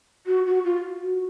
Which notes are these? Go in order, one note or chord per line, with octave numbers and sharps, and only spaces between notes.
F#4
F#4
F4
F#4